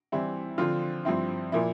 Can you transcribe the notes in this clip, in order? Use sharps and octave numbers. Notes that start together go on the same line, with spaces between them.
E3 G3 C4 E4
D3 F3 C4 F4
G2 F3 C4 E4
A#2 F3 A#3 E4